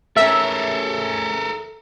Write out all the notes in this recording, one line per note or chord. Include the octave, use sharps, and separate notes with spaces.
A3 C#4 A4 A#4 E5